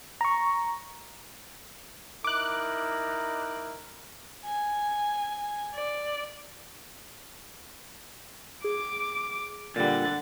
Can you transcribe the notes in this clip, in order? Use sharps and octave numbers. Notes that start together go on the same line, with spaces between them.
A#5 C#6
D#4 E4 A#4 D6 F#6
G#5
D5
G#4 D6
A#2 D3 G3 F#5 A6